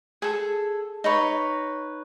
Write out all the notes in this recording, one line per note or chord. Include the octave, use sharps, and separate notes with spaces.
G#4 A4
D#4 B4 C#5